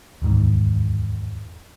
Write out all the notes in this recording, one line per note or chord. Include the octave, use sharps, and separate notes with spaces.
D1 E2 G#2 D#3